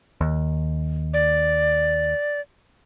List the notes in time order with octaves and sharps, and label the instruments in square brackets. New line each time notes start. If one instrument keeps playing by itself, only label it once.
[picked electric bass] D#2
[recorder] D5